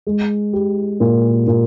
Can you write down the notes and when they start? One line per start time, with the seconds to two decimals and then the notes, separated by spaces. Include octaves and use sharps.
0.07 G#3
0.53 G4
1.00 A#2
1.47 A#2